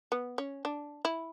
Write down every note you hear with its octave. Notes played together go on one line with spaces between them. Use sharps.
B3
C#4
D4
E4